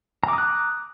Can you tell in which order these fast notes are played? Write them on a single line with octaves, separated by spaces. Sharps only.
A#5 D6 D#6 F#6